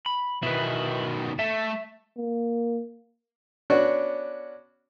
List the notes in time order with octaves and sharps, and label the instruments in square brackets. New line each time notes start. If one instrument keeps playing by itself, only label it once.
[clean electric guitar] B5
[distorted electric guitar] B2 D#3 [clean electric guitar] E4 B4
[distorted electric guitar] A3 [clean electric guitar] E5
[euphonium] A#3
[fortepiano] B3 C#4 D4 F#4 D5 F#5